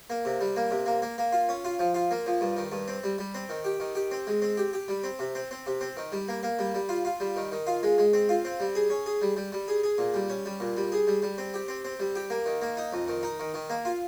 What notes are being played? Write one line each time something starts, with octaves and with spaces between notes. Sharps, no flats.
A#3
C3
G3
A#3
C3
A#3
A#3
A#3
F4
C#4
F4
F3
F4
A#3
F3
G2
D#3
G2
C4
G3
G3
C4
D#3
G4
D#3
G4
C4
G#3
C4
G4
G4
G3
C4
C3
C4
C4
C3
C4
D#3
G3
A#3
A#3
G3
G3
F4
F4
G3
D#3
D#3
F4
G#3
G#3
C4
F4
C4
G3
G#4
C#4
G#4
G3
G3
G3
G#4
G#4
A#2
G3
C#4
G3
A#2
G3
G#4
G3
G3
C4
G4
C4
C4
G3
G4
A#3
D#3
A#3
D#4
F2
D#3
D#4
D#3
D#3
A#3
F4